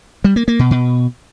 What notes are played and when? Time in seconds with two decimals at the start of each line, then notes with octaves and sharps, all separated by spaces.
0.24 G3
0.36 A#3
0.48 A#3
0.59 B2
0.71 B2